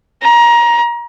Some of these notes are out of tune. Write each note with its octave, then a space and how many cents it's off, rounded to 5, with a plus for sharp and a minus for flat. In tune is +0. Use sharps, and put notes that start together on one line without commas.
A#5 +25